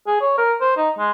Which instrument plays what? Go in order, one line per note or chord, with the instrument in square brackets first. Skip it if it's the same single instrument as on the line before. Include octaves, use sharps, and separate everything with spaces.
[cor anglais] G#4
C#5
A#4
C5
D#4
G#3